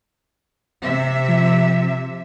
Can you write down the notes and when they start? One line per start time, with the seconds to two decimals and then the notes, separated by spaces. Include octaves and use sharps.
0.82 C3 E5
1.29 F3